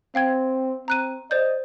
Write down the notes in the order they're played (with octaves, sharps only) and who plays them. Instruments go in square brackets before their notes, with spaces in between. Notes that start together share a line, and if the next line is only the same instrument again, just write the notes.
[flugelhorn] C4 [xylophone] F5 G5 G#6
[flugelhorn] C4 [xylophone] A#5 F#6 D#7
[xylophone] C5 D5 G6 [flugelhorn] D#5